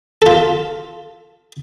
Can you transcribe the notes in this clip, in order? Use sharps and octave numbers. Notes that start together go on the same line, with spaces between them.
F4 A4